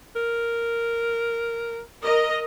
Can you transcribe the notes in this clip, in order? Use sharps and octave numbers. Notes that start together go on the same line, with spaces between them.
A#4
A#4 D#5